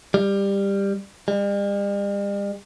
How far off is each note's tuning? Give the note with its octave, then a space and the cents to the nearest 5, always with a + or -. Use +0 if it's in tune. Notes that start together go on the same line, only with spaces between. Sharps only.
G3 +15
G3 +45